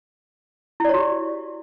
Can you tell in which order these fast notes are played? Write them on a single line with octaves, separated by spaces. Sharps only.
E4 D5 C#5 F#4 G4